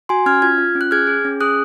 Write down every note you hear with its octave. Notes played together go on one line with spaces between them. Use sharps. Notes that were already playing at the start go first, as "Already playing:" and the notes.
F#4 G#5 C6
C#4 F6 G#6
F4 F6 G#6
F4
C#4
F#6
G#4 F6 G#6
G#4
C#4
G#4 D#6 F#6